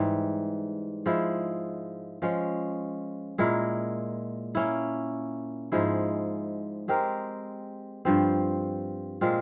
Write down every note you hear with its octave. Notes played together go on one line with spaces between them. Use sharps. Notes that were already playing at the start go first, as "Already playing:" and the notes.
Already playing: G#2 E3 G3
F3 G#3 E4
F3 G#3 C#4
A#2 G#3 E4 A#4
A#3 C#4 E4
G#2 F3 G#3 E4
G#3 C4 G4 A#4
G2 F3 C4
A#2 G#3 C4 F4